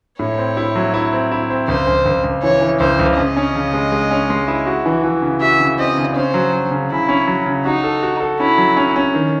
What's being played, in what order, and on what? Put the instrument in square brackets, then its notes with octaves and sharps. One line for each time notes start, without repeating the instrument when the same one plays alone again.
[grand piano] A2 [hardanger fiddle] C#5
[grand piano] C4
E4
F#3
E4
C4
E4
C4
[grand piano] C#2 [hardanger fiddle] C5
[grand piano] C#2
C#2
C#2
[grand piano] E3 [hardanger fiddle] C#5
[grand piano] E3
[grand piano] C#2 [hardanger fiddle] C5
[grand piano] C#2
[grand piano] C#3 [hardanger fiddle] D#5
[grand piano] C#4
C#3
G#3
G#3
C#4
G#3
E4
F#4
E3
E3
C#3
[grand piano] F#4 [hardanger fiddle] E5
[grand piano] C#3
[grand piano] C4 [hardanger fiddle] D#5
[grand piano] C#3
[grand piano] C#4 [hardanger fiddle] C5
[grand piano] F#3
F#3
C#3
[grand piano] C#3 [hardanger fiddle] E4
[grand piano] C#4
F#3
C#3
[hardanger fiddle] D#4 [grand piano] F#4
[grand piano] A4
F#4
A4
[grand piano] C#4 [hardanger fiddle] E4
[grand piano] F#3
C#4
C#4
D#3